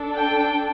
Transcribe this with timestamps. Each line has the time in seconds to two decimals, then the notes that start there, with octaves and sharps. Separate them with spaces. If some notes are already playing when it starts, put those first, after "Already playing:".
Already playing: D4 A4
0.15 G5